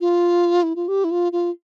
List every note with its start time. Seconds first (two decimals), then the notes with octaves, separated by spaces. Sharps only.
0.01 F4
0.63 E4
0.76 F4
0.88 G4
1.04 E4
1.11 F4
1.32 F4